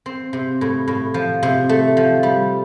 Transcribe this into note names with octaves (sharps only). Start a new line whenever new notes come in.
C4
C3
A2
A2
F3
C3
A3
F3
G3